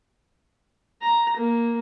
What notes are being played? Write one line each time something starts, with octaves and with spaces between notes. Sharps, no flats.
A#5
A#3